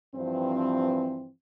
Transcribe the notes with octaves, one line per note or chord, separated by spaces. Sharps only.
G2 E3 F3 C4